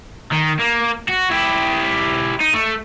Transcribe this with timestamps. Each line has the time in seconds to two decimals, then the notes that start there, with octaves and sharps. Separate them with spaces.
0.32 D#3
0.60 A#3
1.08 F#4
1.30 E4 G4
2.41 D#4
2.54 A3